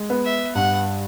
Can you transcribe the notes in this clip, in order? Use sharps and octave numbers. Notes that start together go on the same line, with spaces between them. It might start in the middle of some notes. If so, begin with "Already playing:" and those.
Already playing: G#3
B3
E5
G2 F#5